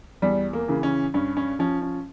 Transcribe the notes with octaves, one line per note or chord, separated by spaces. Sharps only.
E2 G3
A#3
C#3 E3
C#4
G2 C#4
C#4
F3 C#4
C#4